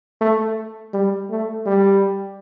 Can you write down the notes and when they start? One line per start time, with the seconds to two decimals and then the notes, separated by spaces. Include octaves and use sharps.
0.21 A3
0.94 G3
1.31 A3
1.66 G3